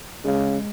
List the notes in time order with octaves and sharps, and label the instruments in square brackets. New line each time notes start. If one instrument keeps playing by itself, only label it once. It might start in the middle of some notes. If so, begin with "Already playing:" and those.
[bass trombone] C#3 [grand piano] G#3